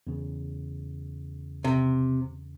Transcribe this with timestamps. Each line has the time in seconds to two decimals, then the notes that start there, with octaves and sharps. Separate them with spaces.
0.07 E2 C#3
1.64 C3